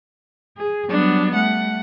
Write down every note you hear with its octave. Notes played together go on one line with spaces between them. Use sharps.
G#4
F#3 G3 B3 D4
G3 A3 F#5